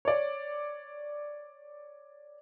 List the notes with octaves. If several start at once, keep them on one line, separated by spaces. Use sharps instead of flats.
C#5 D5